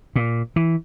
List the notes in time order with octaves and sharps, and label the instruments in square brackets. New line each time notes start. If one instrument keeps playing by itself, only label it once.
[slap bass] A#2
E3